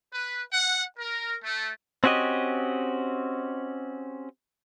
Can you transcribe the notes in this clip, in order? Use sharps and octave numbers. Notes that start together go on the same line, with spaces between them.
B4
F#5
A#4
A3
C4 C#4 F#4 G4 D#5